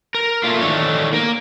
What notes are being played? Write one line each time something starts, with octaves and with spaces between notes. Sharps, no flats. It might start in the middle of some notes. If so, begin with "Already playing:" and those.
A#4
A3 A#3 F4
D#3 E3 A3 D4 C#5
A#3 A#4